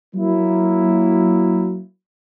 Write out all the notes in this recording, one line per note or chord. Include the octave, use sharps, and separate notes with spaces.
F#3 A#3 E4